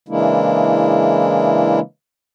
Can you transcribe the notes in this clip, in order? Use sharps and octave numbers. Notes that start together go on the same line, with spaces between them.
C#3 E3 G#3 A#3 D4 E4